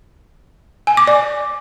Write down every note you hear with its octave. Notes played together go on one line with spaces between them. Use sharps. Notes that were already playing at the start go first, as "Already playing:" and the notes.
G#5
D6
D5